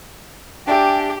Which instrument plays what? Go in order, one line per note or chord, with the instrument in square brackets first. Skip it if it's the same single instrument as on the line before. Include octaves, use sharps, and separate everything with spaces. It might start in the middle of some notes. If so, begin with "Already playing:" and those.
[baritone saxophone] D4 [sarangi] G4 [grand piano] D5 E5 G#5 [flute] G5